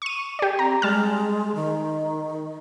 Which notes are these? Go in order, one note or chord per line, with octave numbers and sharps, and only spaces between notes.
C#6 D#7
G4 D5
C4 A#5
G3 G#3 A5 F6
D#3